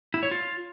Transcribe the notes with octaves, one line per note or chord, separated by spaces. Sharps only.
E4
C#5
F4